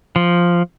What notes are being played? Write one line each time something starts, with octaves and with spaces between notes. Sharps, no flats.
F3